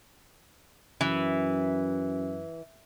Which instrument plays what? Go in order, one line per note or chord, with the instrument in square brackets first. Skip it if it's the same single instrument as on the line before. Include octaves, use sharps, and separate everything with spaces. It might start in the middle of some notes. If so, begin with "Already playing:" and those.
[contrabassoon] F#2 [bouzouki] E3